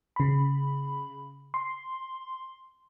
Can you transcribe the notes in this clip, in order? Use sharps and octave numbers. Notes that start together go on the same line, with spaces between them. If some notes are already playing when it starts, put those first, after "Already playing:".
C#3 B5
C6